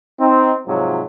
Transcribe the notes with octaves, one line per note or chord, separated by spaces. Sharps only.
C4 D#4
G#2 C3 F3 F#3